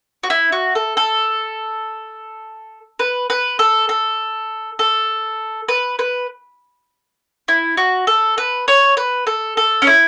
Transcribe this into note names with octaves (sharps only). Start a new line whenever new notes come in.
F#4
E4
F#4
A4
A4
B4
B4
A4
A4
A4
B4
B4
E4
F#4
A4
B4
C#5
B4
A4
A4
C#4
E4